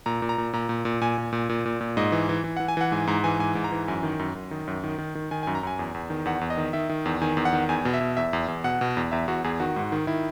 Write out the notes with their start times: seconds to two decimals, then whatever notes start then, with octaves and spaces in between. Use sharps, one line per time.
0.06 A#2 A#5
0.22 A#2
0.29 A#5
0.38 A#2
0.53 A#2 A#5
0.69 A#2
0.85 A#2
1.01 A#2 G#5
1.18 A#2
1.33 A#2
1.49 A#2
1.65 A#2
1.81 A#2
1.97 G#2 D#5
2.12 E3
2.29 E3
2.44 E3
2.57 E3 F#5
2.68 G#5
2.77 E3 F#5
2.92 G#2 G#5
3.07 G#2 A#5
3.24 E3 G#5
3.39 G#2 G#5
3.55 G#2
3.64 A#5
3.72 E3
3.88 F#2 G#5
4.03 D#3
4.19 F#2
4.35 F#2
4.51 D#3
4.67 F#2
4.84 D#3
4.98 D#3
5.15 D#3
5.31 D#3 G#5
5.43 G#5
5.47 F#2
5.55 A#5
5.63 F#2 G#5
5.79 E2
5.94 E2
6.10 D#3
6.25 E2 F#5
6.41 E2
6.50 D#5
6.57 D#3
6.73 D#3 E5
6.89 D#3
7.06 E2
7.22 D#3 G#5
7.37 E2
7.45 F#5
7.53 D#3
7.69 E2 G#5
7.85 B2
7.94 E5
8.01 B2
8.17 E2 E5
8.33 E2
8.48 E2
8.64 B2 F#5
8.81 B2
8.97 E2
9.12 E2 E5
9.28 E2 F#4
9.44 E2 G#4
9.60 D#3 F#4
9.76 G#2
9.92 D#3
10.07 D#3 E4